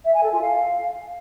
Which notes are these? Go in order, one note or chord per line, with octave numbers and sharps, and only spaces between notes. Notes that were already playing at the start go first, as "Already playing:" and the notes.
E5
G#5
A4
F4
F5